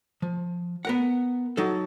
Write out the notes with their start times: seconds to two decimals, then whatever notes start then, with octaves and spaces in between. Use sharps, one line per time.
0.22 F3
0.85 B3 A#4 F#5
1.57 F#3 D#4 A4